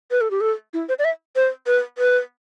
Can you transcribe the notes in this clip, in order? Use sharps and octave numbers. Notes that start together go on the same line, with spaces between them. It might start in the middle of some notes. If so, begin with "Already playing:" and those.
B4
A4
G4
A4
E4
C5
D5
E5
C5
B4
B4